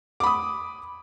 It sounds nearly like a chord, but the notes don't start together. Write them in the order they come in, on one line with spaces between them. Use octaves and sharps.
D6 B5 D#6